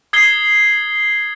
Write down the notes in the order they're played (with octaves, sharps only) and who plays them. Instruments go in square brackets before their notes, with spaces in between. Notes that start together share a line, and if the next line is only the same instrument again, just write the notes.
[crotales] D#6 G#6 C7 G7